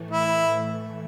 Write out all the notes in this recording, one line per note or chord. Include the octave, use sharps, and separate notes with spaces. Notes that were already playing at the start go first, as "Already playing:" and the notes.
Already playing: A2 E3 A3
E4